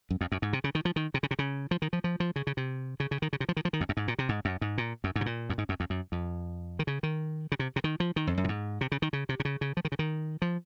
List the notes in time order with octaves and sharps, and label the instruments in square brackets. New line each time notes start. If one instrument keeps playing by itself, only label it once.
[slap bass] F#2
F2
F#2
G#2
C3
C#3
D#3
F3
D#3
C3
C#3
C3
C#3
F3
D#3
F3
F3
F3
C#3
C#3
C3
C#3
C#3
D#3
C#3
C3
F3
D#3
F3
D#3
F2
F#2
G#2
A#2
C3
G#2
F#2
G#2
A#2
F#2
G#2
C3
A#2
F#2
G#2
F#2
F2
F#2
F2
D#3
C#3
D#3
C#3
C3
C3
D#3
F3
D#3
F2
F#2
A#2
G#2
C3
C#3
D#3
C#3
C3
C3
C#3
C#3
F3
D#3
C#3
D#3
F3